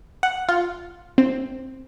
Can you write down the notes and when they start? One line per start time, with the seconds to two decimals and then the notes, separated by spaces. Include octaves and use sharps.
0.23 F#5
0.49 F4
1.18 C4